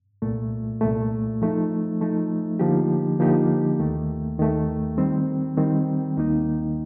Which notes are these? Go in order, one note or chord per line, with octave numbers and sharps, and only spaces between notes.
C2 A#2 A3
C2 A#2 A3
F3 A3 D#4
F3 A3 D#4
D3 F3 A#3 D#4 G4
D3 F3 A#3 D#4 G4
D#2 D#3 A3
D#2 D#3 A3
D#3 G3 C4
D#3 G3 C4
D#2 D#3 A#3 D#4